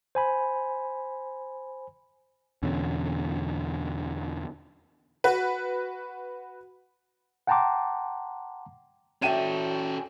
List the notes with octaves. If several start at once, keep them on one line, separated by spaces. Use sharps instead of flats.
C5 G#5 B5
E2 B2 D3 C#4
F#4 B4
F#5 G5 A5 A#5 C6 D6
C#4 F#4 A4 D5 E5 G5 D#7 E7